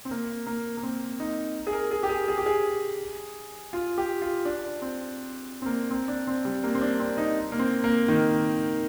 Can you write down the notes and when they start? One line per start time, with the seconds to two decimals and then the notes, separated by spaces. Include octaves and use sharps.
0.05 C4
0.11 A#3
0.46 A#3
0.77 A#3
0.83 C4
1.20 D#4
1.67 G#4
1.73 A#4
1.91 G#4
2.03 G4
2.09 G#4
2.28 G#4
2.38 G4
2.46 G#4
3.73 F4
3.98 G4
4.22 F4
4.45 D4
4.82 C4
5.62 C4
5.66 A#3
5.91 C4
6.08 D4
6.27 C4
6.45 G3
6.64 A#3
6.75 C4
6.82 D4
7.00 C4
7.17 D#4
7.52 A#3
7.59 C4
7.84 A#3
8.08 D#3